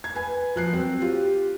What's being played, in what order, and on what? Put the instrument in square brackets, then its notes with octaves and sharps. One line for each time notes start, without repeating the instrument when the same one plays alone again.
[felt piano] G#6
B4 G#5
F3 F#6 C7
F#3 C4
[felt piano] F4 [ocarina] G4